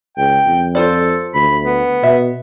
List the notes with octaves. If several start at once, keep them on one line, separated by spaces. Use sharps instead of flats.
C#2 G5
F2
F4 A4 C5 D5
D2 B5
B3
B2 E5